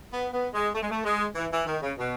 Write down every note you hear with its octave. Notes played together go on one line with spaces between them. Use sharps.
B3
B3
G#3
A3
G#3
A3
G#3
E3
E3
D#3
C#3
B2